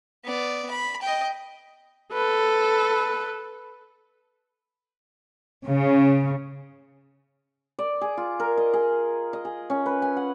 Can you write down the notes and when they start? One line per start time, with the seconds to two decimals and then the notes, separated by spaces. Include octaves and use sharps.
0.25 B3 D5
0.71 B5
1.02 D#5 G5
2.13 A4 B4
5.66 C#3
7.79 D5
8.01 G#4
8.17 F4
8.40 A#4
8.58 D#5
8.73 G#4
9.33 D#5
9.45 G#4
9.70 C#4
9.86 B4
10.02 G#5
10.17 F#5